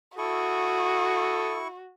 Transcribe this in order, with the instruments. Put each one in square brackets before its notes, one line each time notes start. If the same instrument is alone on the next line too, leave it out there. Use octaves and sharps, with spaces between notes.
[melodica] E4 C#6 [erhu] F#4 [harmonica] A4 D#6